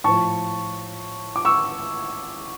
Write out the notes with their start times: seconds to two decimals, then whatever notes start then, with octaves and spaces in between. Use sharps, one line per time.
0.04 A2 F3 A5 C#6
1.36 D6
1.45 C#6 E6